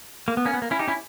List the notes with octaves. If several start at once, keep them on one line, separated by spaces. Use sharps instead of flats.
A#3
B3
A#3 C#4
B3
A#3
C#4 E4
D#4 G4
C#4 E4